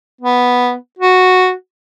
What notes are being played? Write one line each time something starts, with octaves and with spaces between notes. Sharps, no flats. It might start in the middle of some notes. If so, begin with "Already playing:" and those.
B3
F#4